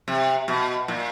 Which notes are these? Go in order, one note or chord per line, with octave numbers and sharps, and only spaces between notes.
C3
B2
A#2